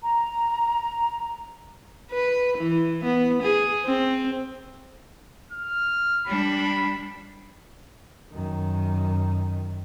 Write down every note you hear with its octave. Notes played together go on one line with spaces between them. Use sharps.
A#5
B4
E3
B3
G#4
C4
F6
G3 D4 B5
F#2 D#3